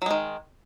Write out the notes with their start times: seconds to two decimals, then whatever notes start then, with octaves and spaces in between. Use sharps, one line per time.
0.02 F#3
0.06 G#3
0.11 D#3